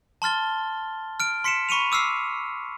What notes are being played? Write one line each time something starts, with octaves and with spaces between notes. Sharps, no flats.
A5 C6 F6 A6 G7
F6 D7
C6 B6 C#7 D7 E7
B5 C#6 C#7 D#7 F7
D6 E6 F6 C7